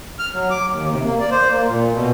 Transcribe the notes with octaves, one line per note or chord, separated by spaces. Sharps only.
F6
F#3
D6
D#2
C3
A#3
D5
C5
A#3
A#2
B2